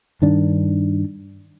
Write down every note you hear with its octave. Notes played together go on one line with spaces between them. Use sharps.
G2 D#3 D4